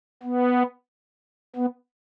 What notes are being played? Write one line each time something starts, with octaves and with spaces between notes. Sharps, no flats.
B3
B3